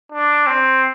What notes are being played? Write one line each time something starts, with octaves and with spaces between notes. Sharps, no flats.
D4
C4